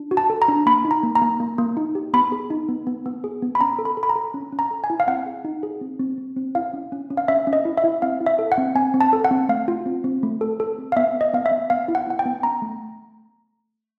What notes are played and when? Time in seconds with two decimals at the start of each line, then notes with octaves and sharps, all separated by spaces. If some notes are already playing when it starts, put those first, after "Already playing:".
Already playing: D4
0.11 F#4
0.17 A5
0.30 A4
0.42 A#5
0.48 D4
0.66 A#3 B5
0.85 D#4
0.91 A#5
1.03 A#3
1.15 A#5
1.21 A#3
1.40 A#3
1.58 A#3
1.77 D#4
1.95 G4
2.14 B3 B5
2.32 G#4
2.50 D#4
2.69 B3
2.87 B3
3.06 B3
3.24 G#4
3.42 B3
3.55 B5
3.61 C#4 A#5
3.79 A4
3.85 B5
3.97 A4
4.03 B5
4.09 A#5
4.16 A4
4.34 C#4
4.52 C#4
4.59 A#5
4.71 A4
4.84 G#5
4.90 E4
5.00 F5
5.08 C4 F#5
5.26 G#4
5.45 D#4
5.63 G#4
5.81 C4
6.00 C4
6.18 C4
6.37 C4
6.55 E4 F5
6.73 C#4
6.92 C#4
7.10 C#4
7.17 F5
7.28 C#4 E5
7.47 C#4
7.53 D#5
7.65 E4
7.77 E5
7.84 E4
8.02 C4 F5
8.21 E4
8.27 E5
8.39 A4
8.52 F#5
8.58 C4
8.75 C4 G#5
8.94 C4
9.01 A5
9.13 A4
9.25 F#5
9.31 C4
9.49 A3 F5
9.68 F4
9.86 C4
10.04 C4
10.23 A3
10.41 A4
10.60 A4
10.78 C4
10.92 F5
10.96 B3 E5
11.15 B3
11.21 D#5
11.33 B3 F5
11.46 E5
11.51 B3
11.70 B3 F5
11.88 E4
11.95 F#5
12.07 B3 F#5
12.19 G5
12.26 B3
12.43 C#4 A#5
12.62 A3